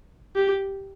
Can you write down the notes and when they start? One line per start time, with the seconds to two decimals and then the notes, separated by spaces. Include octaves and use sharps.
0.36 G4